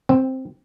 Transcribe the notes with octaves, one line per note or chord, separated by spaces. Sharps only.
C4